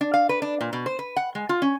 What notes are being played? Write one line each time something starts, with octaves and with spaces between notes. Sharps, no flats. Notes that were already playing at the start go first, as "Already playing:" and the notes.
D4
F5
B4
D4
A#2
B2
C5
B4
F#5
G#3
F4
C#4